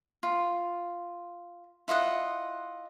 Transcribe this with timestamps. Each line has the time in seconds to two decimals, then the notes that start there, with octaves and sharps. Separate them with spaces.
0.23 F4
1.88 E4 F4 D#5 F#5